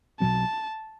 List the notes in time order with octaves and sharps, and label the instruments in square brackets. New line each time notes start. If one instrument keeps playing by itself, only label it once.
[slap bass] B1 B2 F#3 C4 [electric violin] A5